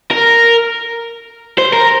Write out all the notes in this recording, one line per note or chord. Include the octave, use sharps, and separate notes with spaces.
A#4
C5
A#4